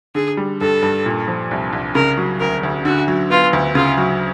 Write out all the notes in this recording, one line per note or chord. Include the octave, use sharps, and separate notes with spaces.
D3 G#4
G3
G2 A4
G2
A#2
F3
C2
C2
C#3 A#4
F#3
D2 A#4
D2
D3 F#4
F#3
B3 F4
D2
C#3 F4
F#3